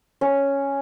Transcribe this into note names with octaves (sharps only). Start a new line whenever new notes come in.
C#4